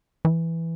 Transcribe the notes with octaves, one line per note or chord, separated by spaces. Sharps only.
E3